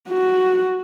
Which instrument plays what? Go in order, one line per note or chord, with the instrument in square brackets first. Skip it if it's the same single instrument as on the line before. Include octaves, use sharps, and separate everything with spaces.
[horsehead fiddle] F#4